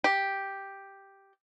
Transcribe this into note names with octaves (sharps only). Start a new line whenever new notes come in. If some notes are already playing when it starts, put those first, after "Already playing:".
G4